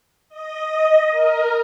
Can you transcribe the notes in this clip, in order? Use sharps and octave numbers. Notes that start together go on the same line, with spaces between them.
D#5
A#4